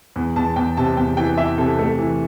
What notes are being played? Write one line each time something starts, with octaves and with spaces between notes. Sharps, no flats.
E2
E2 A5
E2 G5
C3 A5
E2 G5
E3 G5
E3 E5
C3 A4
A3
E3